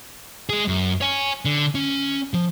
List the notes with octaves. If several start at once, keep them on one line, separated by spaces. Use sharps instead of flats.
G#3 G#4
F#2
C#5 G#5
D3
C#4
F3